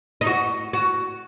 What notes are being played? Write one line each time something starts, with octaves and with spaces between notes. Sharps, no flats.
D#4
F#4
F#4